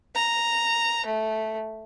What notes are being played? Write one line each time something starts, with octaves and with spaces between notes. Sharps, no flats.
A#5
A3